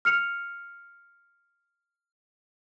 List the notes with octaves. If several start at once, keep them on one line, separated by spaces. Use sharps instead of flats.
F6 C#7 F7